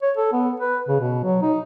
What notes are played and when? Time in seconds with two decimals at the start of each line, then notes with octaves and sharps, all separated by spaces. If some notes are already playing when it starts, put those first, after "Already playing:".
0.02 C#5
0.17 A4
0.33 B3
0.60 B4
0.88 C#3
1.00 B2
1.24 F#3
1.42 D#4